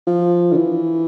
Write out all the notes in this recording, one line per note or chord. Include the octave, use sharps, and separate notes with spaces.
F3
D3
E3